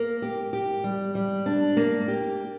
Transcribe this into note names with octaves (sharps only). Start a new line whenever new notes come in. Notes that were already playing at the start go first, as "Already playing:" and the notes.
Already playing: A#3
G4
G4
G3
G3
D4
A#3
G4